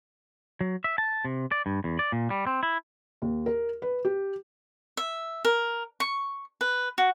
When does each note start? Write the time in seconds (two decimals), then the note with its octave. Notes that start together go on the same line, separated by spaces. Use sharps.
0.61 F#3
0.84 E5
0.98 A5
1.25 C3
1.52 D5
1.66 G2
1.84 E2
1.99 D5
2.12 A#2
2.30 G3
2.47 C4
2.63 E4
3.22 D#2
3.46 A#4
3.82 B4
4.05 G4
4.97 E5
5.45 A#4
6.00 C#6
6.61 B4
6.98 F#4